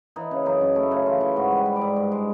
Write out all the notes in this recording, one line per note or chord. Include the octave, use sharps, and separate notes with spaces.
E3 D#4
C#3
F#2 D#4
F#2
A3 E4
C#3
E3 F4
E3
G#2 F#4
G3
B4
G3
D5
G#2
G2
G#3